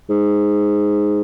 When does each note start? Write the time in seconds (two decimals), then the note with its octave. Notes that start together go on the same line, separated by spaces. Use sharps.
0.09 G#2